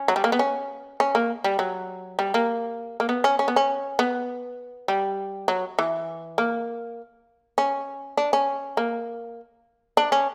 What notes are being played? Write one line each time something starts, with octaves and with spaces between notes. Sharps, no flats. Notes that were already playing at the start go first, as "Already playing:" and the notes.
Already playing: C#4
F#3
G3
A#3
B3
C#4
C#4
A#3
G3
F#3
G3
A#3
A#3
B3
C#4
C#4
B3
C#4
B3
G3
F#3
E3
A#3
C#4
D4
C#4
A#3
D4
C#4